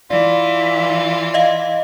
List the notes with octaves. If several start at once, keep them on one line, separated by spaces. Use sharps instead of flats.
E3 F4 D5
D#5 F5